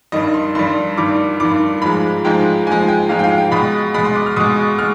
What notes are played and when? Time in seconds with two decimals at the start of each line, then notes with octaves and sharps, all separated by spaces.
0.12 G2 D#3 G3 D#5
0.34 C6
0.55 G2 D#3 G3 C6
0.97 G2 D#3 G3 D6
1.40 G2 D#3 G3 D6
1.82 G#2 F3 G#3 B5
2.25 G#2 F3 G#3 G5
2.67 G#2 F3 G#3 G#5
2.88 G5
3.09 G#2 F3 G#3 F5
3.19 G5
3.24 F5
3.38 G5
3.52 B2 G#3 B5
3.94 B2 G#3 B5
4.05 C6
4.16 D6
4.26 F6
4.36 B2 G#3 D#6
4.79 G#3 F6